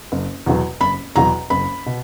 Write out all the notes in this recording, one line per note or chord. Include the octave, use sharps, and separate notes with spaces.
F#1
E2 B2 F#3
F#1 B5
E2 B2 F#3 A#5
F#1 B5
B2